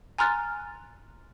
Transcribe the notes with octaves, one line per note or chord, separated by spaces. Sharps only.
G#5 A#5 C6 F6 F#6 A6